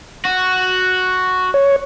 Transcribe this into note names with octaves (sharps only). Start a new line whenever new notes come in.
F#4
C#5